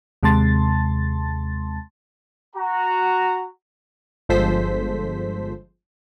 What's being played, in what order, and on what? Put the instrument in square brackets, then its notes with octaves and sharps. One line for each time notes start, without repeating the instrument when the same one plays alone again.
[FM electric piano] D#2 C3 G#3 A5 C6 A6
[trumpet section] F#4 A#5
[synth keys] G1 F3 G#3 A4 C5 B6